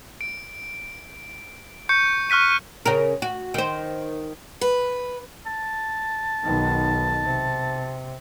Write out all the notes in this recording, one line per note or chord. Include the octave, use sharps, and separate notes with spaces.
D7
C#6 G6 C#7
C#6 F6 F#6 B6 D#7
C#3 A#4
F#4
D#3 C5
B4
A5
B1 D#3
C3